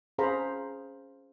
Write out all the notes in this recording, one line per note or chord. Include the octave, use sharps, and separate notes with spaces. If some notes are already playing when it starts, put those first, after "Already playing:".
C#4 G#4 C5 F5 A#5 B5